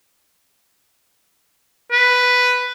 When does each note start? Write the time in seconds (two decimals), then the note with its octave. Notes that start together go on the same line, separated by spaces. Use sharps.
1.91 B4